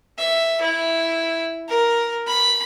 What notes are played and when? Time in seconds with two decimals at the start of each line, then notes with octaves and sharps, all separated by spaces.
0.18 E5
0.61 E4
1.68 A#4
2.27 B5